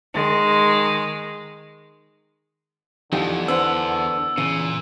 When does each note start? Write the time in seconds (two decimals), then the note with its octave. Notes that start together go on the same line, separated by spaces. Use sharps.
0.14 D#3 G#3
3.13 E2 D3 E3 F3 D#4 G4
3.48 B3 D4 C5 E6
4.38 E2 A#2 C#3